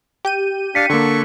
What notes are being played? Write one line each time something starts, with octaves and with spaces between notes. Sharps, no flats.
G4 G6 D#7
D4 F5 B6 C#7
D3 A#3 A4 C#6